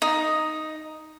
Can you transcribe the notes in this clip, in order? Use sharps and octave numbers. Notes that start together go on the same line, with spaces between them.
D#4